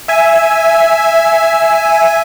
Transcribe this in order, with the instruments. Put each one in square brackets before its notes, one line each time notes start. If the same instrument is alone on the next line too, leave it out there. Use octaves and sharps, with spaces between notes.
[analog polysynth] E5 G#5